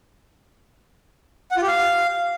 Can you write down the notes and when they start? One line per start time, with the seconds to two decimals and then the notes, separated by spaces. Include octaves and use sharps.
1.51 F#5
1.57 F4
1.62 G4
1.68 F5